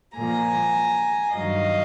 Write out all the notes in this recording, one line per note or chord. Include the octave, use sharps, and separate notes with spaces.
A#2 F3 A#3 G#5 A#5
G2 D#3 F#3 D#5 F5